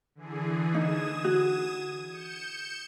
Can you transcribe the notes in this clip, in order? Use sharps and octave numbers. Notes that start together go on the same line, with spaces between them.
D3 E3 G#4
D#4 D#6 G#6 E7
F#4
G6 C#7 E7